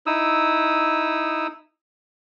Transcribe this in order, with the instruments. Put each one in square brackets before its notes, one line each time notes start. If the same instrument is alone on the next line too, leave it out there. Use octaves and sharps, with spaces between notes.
[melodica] D#4 E4 D#6 E6